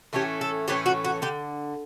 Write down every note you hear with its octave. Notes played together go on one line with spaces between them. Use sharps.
A2 E3 A3 C#4 G4
A4
A2 E3 A3 C#4 G4
F#4
F#4
D3 G4